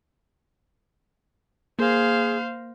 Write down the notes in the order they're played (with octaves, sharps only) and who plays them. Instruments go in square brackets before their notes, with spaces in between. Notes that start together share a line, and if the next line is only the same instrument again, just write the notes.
[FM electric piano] A#3 [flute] G#4 [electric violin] C5 F5